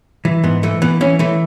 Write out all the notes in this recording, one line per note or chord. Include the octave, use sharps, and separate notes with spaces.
E3
G#2 B3
E3 A3
E3 B3
E3 C#4
E3 A3